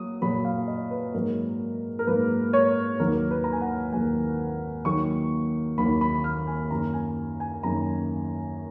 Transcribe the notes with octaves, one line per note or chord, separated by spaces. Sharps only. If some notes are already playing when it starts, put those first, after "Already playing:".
Already playing: F#3 A#3 D#6
A#2 F#3 A#3 B5
F5
D#5
B4
G#2 F#3 A#3 A#4
A#4
G#2 F#3 A#3 B4
C#5
D#2 D#3 F#3 A#3 A#4
B4
A#5
G#5
F#5
D#2 D#3 F#3 A#3 G#5
D#2 D#3 F#3 A#3 C#6
D#2 D#3 F#3 A#3 B5
B5
F6
G#5
F#2 D#3 F#3 A#3 A#5
G#5
G#5
F#2 D#3 F#3 A#3 A#5